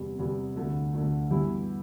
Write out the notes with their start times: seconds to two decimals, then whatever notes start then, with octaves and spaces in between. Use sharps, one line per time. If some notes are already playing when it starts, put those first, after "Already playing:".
Already playing: E2 C3 G3 B3
0.19 E2 C3 G3 B3
0.55 D2 D3 A3
0.93 D2 D3 A3
1.30 G2 E3 B3 E4 G4